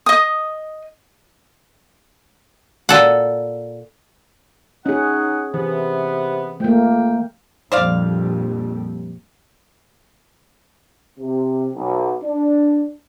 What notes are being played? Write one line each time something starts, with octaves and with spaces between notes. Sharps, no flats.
D#5 D#6
A#2 A4 F#5
C#4 D#4 G#4 F#5
C3 E3 B3
F2 A3 A#3 G5
A#1 F2 G3 C5 D5 F5
C3
B1
D4